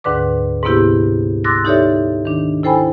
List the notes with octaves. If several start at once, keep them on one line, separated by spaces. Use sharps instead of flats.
D2 G#2 D3 B4 D6
G#2 C3 A#3 B3 E4 G4
C6 D6 E6 F#6 A6 A#6
D#4 G4 A4 C#5 D5 E5
D#3 D4
E4 A4 C5 G5 G#5 B5